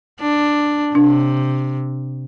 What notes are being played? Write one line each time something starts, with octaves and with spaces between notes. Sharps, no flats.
D4
C3 D4